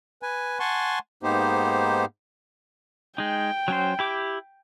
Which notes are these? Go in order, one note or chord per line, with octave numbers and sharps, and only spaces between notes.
B4 G#5
F#5 G#5 A5 C6 C#6
G#2 A#3 B3 D#4 G4 C5
G#3 D#4 G5
F#3 C#4 C5
E4 G4 D6